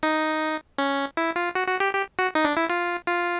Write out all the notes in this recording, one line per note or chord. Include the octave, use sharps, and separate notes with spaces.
D#4
C#4
E4
F4
F#4
F#4
G4
G4
F#4
D#4
D4
E4
F4
F4